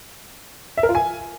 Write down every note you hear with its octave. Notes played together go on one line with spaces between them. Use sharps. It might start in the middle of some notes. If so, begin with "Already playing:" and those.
E5
A#4
F4
G#5